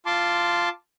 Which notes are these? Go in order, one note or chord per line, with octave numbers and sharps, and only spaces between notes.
F4 A5 C6 D6